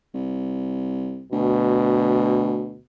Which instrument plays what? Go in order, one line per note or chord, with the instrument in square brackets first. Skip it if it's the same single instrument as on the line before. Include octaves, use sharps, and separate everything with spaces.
[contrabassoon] C2
[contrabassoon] D2 [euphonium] B2